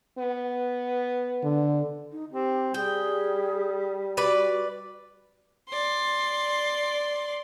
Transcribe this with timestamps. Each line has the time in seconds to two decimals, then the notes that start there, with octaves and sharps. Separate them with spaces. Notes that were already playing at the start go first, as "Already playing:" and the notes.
0.18 B3
1.43 D3
2.12 D#4
2.32 C4 G4
2.74 G3 G#4 G5
4.17 F#4 B4 D5
5.70 D5 C6